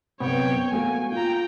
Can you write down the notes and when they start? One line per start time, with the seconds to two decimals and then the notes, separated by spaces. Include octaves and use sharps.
0.20 F#2 C3 B3 C#5 G5
0.72 A3 A#3 F#4 G#5
1.12 F4 G5 A#5